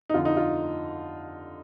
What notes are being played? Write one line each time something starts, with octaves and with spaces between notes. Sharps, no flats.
D#4
F2 D3 F4
D#4
F4